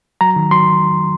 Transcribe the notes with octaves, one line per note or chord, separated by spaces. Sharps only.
F#3 A#5
D#3
F#3 C6